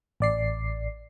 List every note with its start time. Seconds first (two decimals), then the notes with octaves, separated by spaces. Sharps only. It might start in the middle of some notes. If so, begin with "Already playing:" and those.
0.20 A1 D5 C7